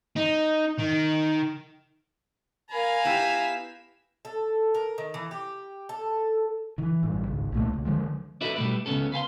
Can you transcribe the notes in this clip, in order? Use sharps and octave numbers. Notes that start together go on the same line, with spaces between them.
D#4
D#3
A#4 F5 G#5 A#5 B5
B3 E4 G4 B6 E7
A4
A#4
D#3
E3
G4
A4
D#3 E3
A1 G2
G#1 C#2
C2 A#2 A3
C#2
D3 D#3 F3 G#3
D4 F#4 A4 B4 D#5 E5
B2 G3 A3 G4 B4
C#2 F#2 B3 C#4 A4
B4 F5 G#5 C6